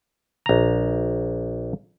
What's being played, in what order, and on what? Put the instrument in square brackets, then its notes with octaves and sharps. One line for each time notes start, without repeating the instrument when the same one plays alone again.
[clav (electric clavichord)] A#1 A#5